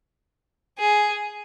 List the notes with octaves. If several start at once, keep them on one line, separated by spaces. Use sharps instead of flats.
G#4